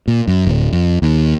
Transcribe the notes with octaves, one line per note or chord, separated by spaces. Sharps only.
A#2
F#2
D1
F2
D#2